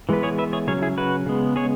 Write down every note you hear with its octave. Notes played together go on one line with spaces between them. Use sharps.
E3 G#3 B3 B4
G#4 C#5
B4 E5
G#4 C#5
C#3 F#3 C#4 G#4 C#5
E4 G#4
F#4 B4
C#3 G#3 B3
G#4 C#5